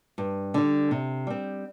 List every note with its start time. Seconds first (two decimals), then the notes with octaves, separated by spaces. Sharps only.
0.18 G2
0.54 D3 G3
0.91 C3
1.27 G3 C4